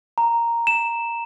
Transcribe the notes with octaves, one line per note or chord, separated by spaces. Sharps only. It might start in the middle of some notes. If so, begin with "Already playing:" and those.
A#5
E7